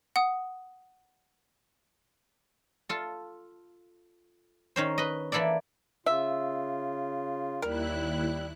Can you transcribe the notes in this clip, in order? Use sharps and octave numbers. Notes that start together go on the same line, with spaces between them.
F#5 D#6
F4 A4
D#3 C#4 C5
B4 D#5
E3 A#3 E4 A4 D5
C#3 F4 E5
D#2 G3 E4 A#4 F#6